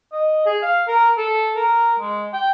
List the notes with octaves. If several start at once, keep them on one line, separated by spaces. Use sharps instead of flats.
D#5
G#4
F5
A#4
A4
A#4
G#3
G5